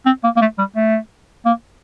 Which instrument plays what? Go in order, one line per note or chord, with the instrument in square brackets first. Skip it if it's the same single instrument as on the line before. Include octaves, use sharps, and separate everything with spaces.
[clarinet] C4
A#3
A#3
A3
G3
A3
A#3